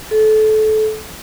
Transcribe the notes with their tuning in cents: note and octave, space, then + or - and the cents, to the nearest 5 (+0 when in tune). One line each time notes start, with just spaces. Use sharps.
A4 -25